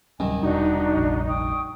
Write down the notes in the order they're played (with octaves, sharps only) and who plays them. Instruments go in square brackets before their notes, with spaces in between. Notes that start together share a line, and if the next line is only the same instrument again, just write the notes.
[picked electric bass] D1 F#3 C#4 [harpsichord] C2 D#3 [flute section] G#5
[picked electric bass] E1 [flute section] D4 F#4 [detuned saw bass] D#4
[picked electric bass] F1 A#1
[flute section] G5 C#6 D#6